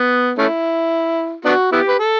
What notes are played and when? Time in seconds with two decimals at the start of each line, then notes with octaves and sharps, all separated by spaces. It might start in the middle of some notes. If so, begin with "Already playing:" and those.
Already playing: B3
0.38 A3 C#4 E4
1.45 B3 D4 F#4
1.72 B3 E4 G4
1.88 B4
1.99 A4